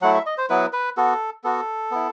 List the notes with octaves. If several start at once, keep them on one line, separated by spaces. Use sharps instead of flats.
F#3 A3 E4 F#5
E5
D#5
C5
F#3 B3 E4 B4
B4
B3 F#4 A4
B3 F#4 A4
B3 E4